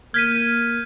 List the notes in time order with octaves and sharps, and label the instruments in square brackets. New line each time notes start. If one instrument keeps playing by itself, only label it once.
[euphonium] A#3 [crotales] F6 G6 [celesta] G#6 B6 D#7